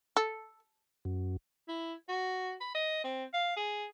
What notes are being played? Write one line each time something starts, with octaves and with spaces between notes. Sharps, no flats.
A4
F#2
E4
F#4
B5
D#5
C4
F5
G#4